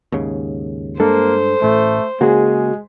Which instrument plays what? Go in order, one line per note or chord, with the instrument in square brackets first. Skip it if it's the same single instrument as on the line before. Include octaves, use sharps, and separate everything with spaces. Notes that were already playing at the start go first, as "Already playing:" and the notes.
[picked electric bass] D#2 G#2 C#3
[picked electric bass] G2 G#3 D4 [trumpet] A#3 [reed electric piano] A4 [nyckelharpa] C5
[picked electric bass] A1 A2 [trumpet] A3
[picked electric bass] C#3 A#3 [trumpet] G#3 [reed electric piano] F#4 G#4